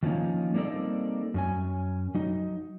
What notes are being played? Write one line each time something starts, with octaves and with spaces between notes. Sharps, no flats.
D#3 F3 A#3 C#4 D#4
G3 A#3 C4 D#4 A4 D5
F#2 C#4 G#5
F#3 D#4